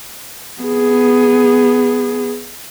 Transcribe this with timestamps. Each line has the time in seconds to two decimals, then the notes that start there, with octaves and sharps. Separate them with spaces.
0.61 B3 G#4